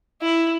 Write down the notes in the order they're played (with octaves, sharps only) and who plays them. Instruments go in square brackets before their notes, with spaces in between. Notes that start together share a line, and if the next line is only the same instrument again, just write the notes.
[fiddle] E4